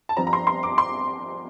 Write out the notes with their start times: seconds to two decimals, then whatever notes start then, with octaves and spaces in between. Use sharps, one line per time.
0.09 A5
0.17 G2 F3 C4 A#5
0.27 A#5
0.33 C6
0.47 C6
0.63 D6
0.78 C6